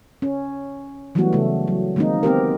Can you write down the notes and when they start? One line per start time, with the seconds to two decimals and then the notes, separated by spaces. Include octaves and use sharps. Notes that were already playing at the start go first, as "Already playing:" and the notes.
0.22 C#4
1.15 E3 F#3 G3 A3 B3 F#4
1.33 C#3 A3
1.68 F#3
1.96 D#3 G#3 A#3 C4 D#4
2.23 B3 C4 G4 A#4